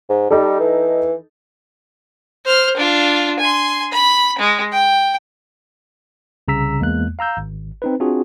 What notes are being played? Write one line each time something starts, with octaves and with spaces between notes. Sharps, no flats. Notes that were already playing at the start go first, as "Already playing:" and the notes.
G#2
G3 D#4 A4
E3
C5 F6
D4 F4
G#5 C6
B5
G#3
G5
C2 C#3 A#5 E6 B6
E2 G#3 A#3 F#6
F5 A#5 E6 G6
G#1
C4 D#4 B4
C4 D4 F4 F#4 G#4